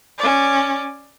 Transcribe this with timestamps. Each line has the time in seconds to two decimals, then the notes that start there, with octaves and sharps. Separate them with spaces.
0.18 C#4 D5